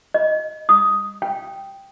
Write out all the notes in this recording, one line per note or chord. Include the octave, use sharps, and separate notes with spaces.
D#5
D#6
G5